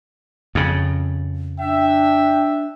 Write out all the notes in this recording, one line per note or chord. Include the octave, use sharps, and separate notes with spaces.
F2 C#3
D4 E5 G5